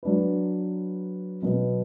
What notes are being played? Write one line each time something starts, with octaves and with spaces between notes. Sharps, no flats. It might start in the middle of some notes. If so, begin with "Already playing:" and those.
F#3 D4 B4
B2 F#3 B3